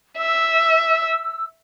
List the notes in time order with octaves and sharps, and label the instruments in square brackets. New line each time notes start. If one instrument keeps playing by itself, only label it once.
[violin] E5 [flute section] E6